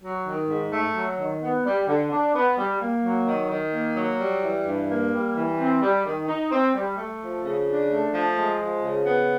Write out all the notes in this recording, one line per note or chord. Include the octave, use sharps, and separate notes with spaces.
F#3
D#3
G#2
A3
F#3
D#3
B3
G3
D3
D4
B3
G3
A#3
F#3
D#3
D#3
A#3
F#3
G3
E3
G2
A#3
G3
E3
C4
G3
D#3
D#4
C4
G3
A3
F3
C#3
D4
A3
F3
G#3
F3
C#3
B3